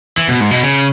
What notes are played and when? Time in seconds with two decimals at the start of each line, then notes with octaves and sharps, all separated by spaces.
0.18 E3
0.28 B2
0.40 G#2
0.51 B2
0.63 C#3